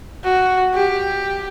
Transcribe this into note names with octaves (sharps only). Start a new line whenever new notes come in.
F#4
G4